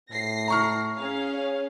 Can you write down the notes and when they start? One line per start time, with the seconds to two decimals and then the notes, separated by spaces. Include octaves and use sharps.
0.11 A2 A#6 C7
0.48 A#5 C#6 F6
0.96 C#4 G#4 F5
1.34 C#5